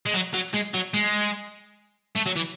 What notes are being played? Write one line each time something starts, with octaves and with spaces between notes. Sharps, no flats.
G#3
F#3
F#3
G#3
F#3
G#3
A3
F#3
E3